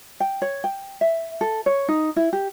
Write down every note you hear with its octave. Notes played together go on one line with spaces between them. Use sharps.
G5
C#5
G5
E5
A4
C#5
D#4
E4
G4